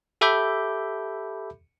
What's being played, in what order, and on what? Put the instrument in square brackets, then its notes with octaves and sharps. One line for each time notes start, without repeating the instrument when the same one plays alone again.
[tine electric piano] G4 A4 E5 B5 D6 G6